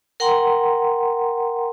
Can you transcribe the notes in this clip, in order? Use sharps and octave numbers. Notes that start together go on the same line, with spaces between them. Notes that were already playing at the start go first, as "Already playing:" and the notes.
A#4 F#5 G5 A#5 C6